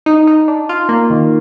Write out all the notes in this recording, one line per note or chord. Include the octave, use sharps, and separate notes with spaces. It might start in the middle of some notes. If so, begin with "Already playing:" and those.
D#4
D#4
D4
F4
A#3
D#3